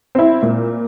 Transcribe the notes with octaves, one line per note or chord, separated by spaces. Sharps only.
C4 E4
A#2